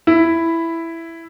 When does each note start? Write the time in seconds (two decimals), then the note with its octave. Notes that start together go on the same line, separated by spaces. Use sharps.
0.07 E4